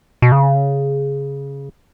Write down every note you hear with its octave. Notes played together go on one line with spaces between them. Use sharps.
B2
C#3